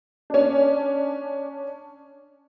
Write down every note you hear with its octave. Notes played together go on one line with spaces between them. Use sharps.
C#4 D4